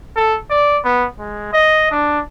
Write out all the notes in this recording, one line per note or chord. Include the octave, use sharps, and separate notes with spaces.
A4
D5
B3
G#3
D#5
D4